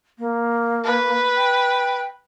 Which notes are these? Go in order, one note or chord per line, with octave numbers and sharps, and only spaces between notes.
A#3
B4
G5